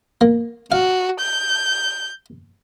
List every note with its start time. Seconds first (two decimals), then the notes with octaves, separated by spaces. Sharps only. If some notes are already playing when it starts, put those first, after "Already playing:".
0.21 A#3
0.72 F#4 F5
1.20 G6